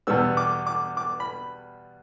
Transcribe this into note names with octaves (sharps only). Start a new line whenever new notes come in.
E2 B2 G3 B3 E6
D6
D6
D6
B5